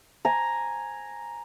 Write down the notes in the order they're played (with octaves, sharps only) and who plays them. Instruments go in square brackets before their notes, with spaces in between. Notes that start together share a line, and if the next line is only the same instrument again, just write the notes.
[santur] G#5 A#5